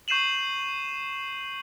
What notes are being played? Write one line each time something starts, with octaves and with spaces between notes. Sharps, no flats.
C#6 G6 C7 D#7 E7 F#7